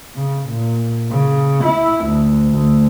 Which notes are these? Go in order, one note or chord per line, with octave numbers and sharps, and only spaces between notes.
C#3
A#2
C#3
E4
D2
D2